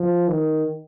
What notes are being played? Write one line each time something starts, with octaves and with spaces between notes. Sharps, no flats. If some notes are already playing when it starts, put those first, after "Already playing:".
Already playing: F3
D#3